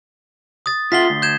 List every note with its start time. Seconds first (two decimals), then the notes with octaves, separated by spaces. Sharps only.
0.66 D#6 A6
0.92 F4 E5 F#5 B6 C7 G7
1.10 D2
1.22 G6 G#6 E7